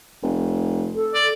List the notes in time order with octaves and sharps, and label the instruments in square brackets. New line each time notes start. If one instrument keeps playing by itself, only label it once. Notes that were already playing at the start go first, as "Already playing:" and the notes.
[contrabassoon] F1
[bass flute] A4
[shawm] D5